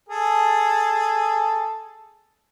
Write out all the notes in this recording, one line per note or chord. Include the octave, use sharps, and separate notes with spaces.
G#4 A4